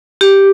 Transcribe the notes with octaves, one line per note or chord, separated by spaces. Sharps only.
G4